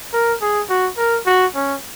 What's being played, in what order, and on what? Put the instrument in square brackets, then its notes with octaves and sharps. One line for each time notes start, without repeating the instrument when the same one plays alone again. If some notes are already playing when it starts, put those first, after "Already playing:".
[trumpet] A#4
G#4
F#4
A#4
F#4
C#4